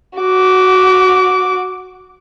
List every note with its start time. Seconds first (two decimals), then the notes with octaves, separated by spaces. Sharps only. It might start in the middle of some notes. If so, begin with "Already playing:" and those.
0.19 F#4 D6